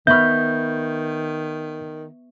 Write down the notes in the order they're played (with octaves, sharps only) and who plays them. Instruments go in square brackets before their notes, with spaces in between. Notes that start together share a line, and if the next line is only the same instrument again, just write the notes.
[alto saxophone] D#3 [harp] B3 B5 F6 [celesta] E5 C#6 [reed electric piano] G6